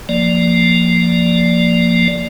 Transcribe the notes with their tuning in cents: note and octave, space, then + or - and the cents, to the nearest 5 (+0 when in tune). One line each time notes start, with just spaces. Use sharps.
F3 +0 A#3 +0 D5 +0